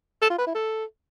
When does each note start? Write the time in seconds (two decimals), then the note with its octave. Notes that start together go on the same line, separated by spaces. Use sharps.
0.22 A4
0.30 F4
0.38 B4
0.47 E4
0.55 A4